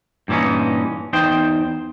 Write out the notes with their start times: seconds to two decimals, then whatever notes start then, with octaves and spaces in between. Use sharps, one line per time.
0.28 G2 A#2 E3 C#4 D#4
1.13 E2 D#4 C5 G5